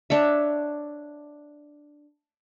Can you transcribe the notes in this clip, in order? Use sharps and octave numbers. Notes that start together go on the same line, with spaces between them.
D4 C#5 E5